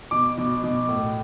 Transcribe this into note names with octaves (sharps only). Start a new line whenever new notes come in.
B2 D6
B2
B2
A2